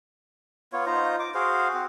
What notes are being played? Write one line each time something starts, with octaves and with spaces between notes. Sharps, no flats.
B3 F4 C#5
D#4 F4 C5 A#5
D6
F#4 G#4 C5 F5
C4 F#4